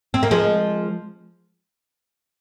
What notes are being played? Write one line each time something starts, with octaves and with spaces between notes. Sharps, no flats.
C4
A#3
F3 G#3